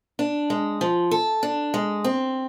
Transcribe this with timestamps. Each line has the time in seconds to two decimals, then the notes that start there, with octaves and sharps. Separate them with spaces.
0.19 D4
0.50 G#3
0.81 F3
1.11 A4
1.43 D4
1.74 G#3
2.04 C4